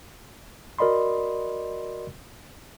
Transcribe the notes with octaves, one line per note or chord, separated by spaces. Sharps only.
F#4 A#4 D5 D#5 B5 C6